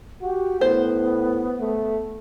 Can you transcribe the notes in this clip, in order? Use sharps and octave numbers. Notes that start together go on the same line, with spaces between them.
F#4 G4
A2 B3 C5
A3